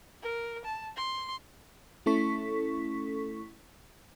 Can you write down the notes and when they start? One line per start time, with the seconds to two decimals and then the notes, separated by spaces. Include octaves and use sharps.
0.22 A#4
0.65 A5
0.96 C6
2.06 A3 C#4 E4 A4 C#6 B6